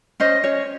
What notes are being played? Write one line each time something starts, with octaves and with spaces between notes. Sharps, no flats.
C#4 C5 D#5
C#4 C#5